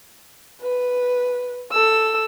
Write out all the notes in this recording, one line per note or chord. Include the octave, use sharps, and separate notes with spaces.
B4
A4 E6